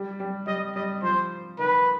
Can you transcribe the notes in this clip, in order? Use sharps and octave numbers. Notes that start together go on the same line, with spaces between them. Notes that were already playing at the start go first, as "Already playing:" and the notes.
Already playing: G3
G3
G3 D#5
G3 D#5
F3 C5
D#3 B4